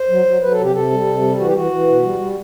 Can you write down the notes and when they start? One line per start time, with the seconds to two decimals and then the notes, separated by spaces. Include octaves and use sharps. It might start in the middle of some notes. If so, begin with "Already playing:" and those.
Already playing: C5
0.09 F#3
0.25 F#3
0.41 F#3 B4
0.52 A4
0.58 C3 G4
0.74 C3 A4
0.91 G3
1.06 C3
1.22 G3
1.39 E3 F#4
1.46 G4
1.55 E3 F#4
1.72 E3
1.88 B2
2.03 G3
2.19 G3